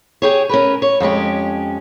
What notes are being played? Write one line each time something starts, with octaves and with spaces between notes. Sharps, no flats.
G4 G#4 C#5
C#4 A#4 B4
C#5
F2 G#3 C#4 G4